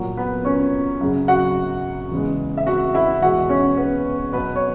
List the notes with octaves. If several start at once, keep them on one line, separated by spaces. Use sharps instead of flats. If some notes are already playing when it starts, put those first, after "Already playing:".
Already playing: A#2 F#3
B3 B4
C#4 C#5
F#2 C#3 F#3
F#4 F#5
E2 C#3 G#3
E5
F#4 F#5
E4 E5
E2 B2 G#3 F#4 F#5
C#4 C#5
B3 B4
B2 F#3 B3 B4
C#5